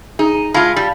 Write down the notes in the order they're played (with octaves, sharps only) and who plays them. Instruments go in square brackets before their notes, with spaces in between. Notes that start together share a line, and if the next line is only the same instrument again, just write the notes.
[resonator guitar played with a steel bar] D#4 [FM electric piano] G#4
[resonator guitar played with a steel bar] G#3 F4 [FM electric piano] F5 A5 B5
[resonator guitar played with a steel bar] G3